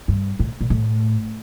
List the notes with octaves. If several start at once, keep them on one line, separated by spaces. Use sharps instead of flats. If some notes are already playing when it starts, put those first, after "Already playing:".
G2
A2
A#2
A2